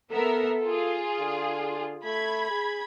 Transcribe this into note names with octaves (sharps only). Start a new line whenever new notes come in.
B3 A4 A#4 E5
F4 G#4
D3
A3 B5 G#6
G#4